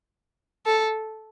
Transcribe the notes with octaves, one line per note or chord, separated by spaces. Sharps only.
A4